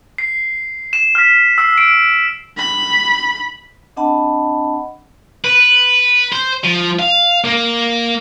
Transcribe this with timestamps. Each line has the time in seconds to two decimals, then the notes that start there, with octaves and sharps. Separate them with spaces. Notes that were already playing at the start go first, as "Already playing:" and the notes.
0.18 C7
0.93 E7
1.15 F6 B6
1.58 E6 C7
1.78 D7
2.57 B5
3.97 C4 D4 D#5 F#5 A5 B5
5.44 B4
6.32 C5
6.64 F3
6.99 F5
7.44 A#3